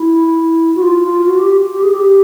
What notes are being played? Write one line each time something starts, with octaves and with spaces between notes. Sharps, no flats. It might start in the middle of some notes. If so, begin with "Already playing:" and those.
Already playing: E4
F#4
F4
F4
F#4
G4
G4
G#4
G4